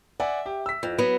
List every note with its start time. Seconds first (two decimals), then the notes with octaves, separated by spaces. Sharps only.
0.20 D5 E5 F#5 G#5
0.46 G4
0.66 E6 B6
0.83 F2
0.98 F#3 B3